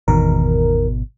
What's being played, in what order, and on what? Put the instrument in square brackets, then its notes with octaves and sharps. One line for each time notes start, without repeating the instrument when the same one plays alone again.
[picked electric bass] G#1 B2 [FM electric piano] E2 D#3 A#4